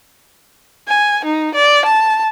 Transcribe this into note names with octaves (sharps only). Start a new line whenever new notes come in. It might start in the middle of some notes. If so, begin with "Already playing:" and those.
G#5
D#4
D5
A5